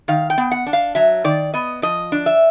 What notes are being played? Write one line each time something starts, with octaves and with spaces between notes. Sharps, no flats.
D#3 F5
G5
B3
F#5
D4
F5
F#3 E5
D#3 D5
B3 D#5
F3 D#5
D4
E5